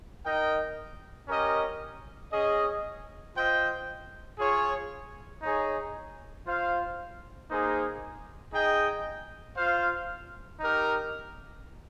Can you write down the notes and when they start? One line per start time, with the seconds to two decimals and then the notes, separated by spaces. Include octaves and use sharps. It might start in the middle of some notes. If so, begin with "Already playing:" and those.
0.24 D#4 A#4 D#5 G5
1.28 C#4 G4 A#4 D#5
2.31 C#4 G#4 D#5
3.35 F4 C5 D#5 G5
4.38 F4 G#4 C#5
5.42 D#4 G#4 C#5
6.46 F4 C5 F5
7.49 A#3 D#4 G#4 C5
8.53 D#4 G#4 D#5 G5
9.56 F4 C5 F5
10.60 D#4 G4 A#4